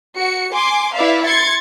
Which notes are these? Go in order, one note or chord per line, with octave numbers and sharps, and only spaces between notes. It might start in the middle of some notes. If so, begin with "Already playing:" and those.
F#4 C#7
G#5 C6 D6
E4 B4 D5 E5 F5
C6 G#6 A6 C#7